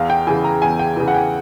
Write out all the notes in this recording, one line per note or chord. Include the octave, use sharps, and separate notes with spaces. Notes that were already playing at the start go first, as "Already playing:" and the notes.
Already playing: E2 F5
G5
C#3 E3 G#5
A#5
E2 G#5
G5
C#3 E3
F#5
G5